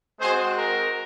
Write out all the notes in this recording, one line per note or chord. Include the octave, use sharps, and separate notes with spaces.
G#3 C4 F#4 G#4 C5
A#4